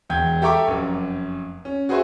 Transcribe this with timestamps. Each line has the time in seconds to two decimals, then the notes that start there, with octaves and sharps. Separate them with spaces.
0.09 E1 E2 G5 G6 G#6
0.42 G4 A4 E5 A#5 C#6 D6
0.68 F1 F#2
1.65 C#4
1.89 F#4 G#4 B4 C5 E5 C#6